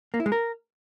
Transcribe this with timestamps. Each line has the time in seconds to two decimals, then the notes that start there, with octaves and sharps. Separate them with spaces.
0.14 A#3
0.20 E4
0.26 G#3
0.32 A#4